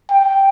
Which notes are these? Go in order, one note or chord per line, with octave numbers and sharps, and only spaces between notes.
G5